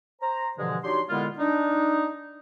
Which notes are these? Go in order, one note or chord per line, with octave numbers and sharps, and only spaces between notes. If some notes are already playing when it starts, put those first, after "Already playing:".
C5 A#5
G2 B2 D3 E3 F3 G#3
D4 D#4 F#4 G4 C#5 C6
A#2 D3 G#3 B3 E4 F4
D4 D#4